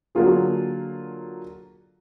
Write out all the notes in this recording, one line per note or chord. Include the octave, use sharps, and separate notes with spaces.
D3 F#3 A#3 F4 G#4